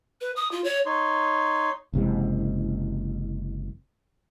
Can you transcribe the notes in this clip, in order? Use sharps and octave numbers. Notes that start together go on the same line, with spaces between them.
B4
D#6
F4
C#5
D#4 C#5 C6
F#1 C3 E3 G#3